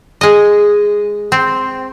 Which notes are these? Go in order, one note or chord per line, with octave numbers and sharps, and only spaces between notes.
G#3 D#5
C4